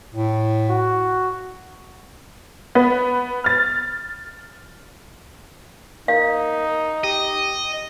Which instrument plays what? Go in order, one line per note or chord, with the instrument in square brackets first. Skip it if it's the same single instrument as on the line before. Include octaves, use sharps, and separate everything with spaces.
[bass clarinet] A2
[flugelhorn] F#4
[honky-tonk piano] B3
F6 A6
[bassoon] A#3 [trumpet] D#4 [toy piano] F5
[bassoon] G4 [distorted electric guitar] D#5